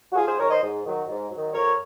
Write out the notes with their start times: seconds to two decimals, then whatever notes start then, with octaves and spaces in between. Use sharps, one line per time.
0.12 F#4
0.16 G#2 F4 G#4
0.27 G#4 C5
0.39 D#3 F#3 A#4 C#5
0.50 C5 D#5
0.63 G#2
0.85 D#3 F#3
1.09 G#2
1.32 D#3 F#3
1.54 F2 A#4 C#5